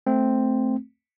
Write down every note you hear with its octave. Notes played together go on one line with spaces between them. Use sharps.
A3 C4